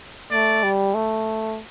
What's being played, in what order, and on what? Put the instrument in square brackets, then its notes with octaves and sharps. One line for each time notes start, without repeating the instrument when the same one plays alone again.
[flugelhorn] A3 [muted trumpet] D5
[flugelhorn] G3
A3